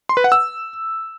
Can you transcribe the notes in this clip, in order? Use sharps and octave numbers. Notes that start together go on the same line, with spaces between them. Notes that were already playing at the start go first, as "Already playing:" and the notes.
C6
B4
F#5
E6